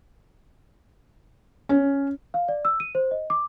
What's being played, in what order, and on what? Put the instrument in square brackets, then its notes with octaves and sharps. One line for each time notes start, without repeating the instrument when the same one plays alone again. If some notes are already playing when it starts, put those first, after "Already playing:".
[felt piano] C#4
[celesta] F5
D5
E6
D#7
C5
D#5
D6